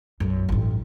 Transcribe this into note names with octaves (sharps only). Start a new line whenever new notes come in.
B1 F#2
A1 G2